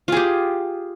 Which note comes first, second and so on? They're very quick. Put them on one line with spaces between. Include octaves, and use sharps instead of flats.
F4 G#4 G4